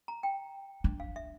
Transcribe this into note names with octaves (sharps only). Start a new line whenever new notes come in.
A#5
G5
D4
F5
E5